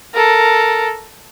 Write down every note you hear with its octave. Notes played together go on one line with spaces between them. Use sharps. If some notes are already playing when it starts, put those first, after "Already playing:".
A4 A#4